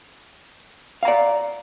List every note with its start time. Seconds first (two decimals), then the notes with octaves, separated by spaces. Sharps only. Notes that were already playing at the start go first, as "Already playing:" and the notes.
1.03 F5
1.05 A#5
1.08 D5